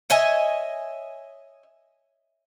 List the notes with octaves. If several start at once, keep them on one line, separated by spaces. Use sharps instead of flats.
C#5 D#5 E5 G#5